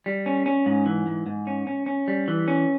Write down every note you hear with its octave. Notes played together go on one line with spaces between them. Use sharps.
G3
C#4
C#4
G#2
E3
G#2
G#2
C#4
C#4
C#4
G3
E3
C#4